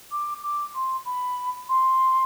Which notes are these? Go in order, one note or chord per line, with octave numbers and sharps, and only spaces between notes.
D6
D6
C6
B5
C6